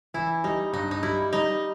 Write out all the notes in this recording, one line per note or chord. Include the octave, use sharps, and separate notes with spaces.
E3 E4
G3 D#4
G2 D#4
D#4
G3 E4
G3 D#4